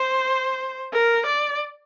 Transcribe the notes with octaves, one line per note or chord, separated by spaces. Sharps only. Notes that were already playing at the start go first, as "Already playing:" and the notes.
Already playing: C5
A#4
D5